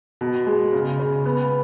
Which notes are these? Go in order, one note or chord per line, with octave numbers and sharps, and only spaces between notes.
B2
G#3
C#3
C#3
B3